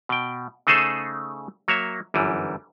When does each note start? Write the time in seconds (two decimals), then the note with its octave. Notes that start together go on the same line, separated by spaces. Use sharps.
0.09 B2 G5
0.67 C#3 A3 D#4 G#4 A4 C5
1.68 F#3 A#3 C#5 E5
2.14 G1 F#2 E3 G3